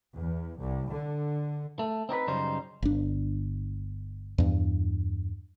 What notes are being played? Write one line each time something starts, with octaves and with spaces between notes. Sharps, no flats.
E2
C2
D3
A3
C4 D#4 G4 B4
F#2 C#3 G3 D#4 C5
G1 D4
E2 G2